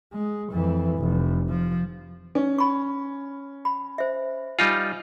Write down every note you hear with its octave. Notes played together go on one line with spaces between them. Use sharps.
G#3
F2 E3
F1
F3
C#4
B5 C#6
B5
C5 E5
G3 D#4 F4 G#5